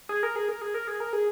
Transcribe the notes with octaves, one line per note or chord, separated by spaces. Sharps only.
G#4
A#4
G#4
A#4
G#4
A#4
G#4
A#4
G#4